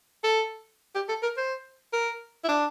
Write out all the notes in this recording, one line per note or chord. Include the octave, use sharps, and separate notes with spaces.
A4
G4
A4
A#4
C5
A#4
E4
D4